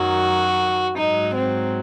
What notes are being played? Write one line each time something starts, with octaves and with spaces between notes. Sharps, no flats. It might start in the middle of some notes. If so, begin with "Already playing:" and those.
Already playing: F#2 D#3 F#3 F#4
G#2 F#3 D#4
C4